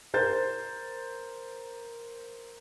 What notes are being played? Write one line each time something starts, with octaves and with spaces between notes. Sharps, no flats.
A#4 C5 G6 A6